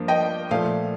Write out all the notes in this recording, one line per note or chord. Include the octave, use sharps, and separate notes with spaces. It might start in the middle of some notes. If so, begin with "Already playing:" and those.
Already playing: G2 F3 A#3 D4
D#5 G5
A#2 F3 A3 F5